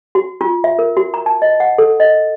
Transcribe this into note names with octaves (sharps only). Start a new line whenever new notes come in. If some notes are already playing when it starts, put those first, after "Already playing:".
F#4
F4
E5
A#4
F#4
A#5
A5
D#5
F#5
A4
D#5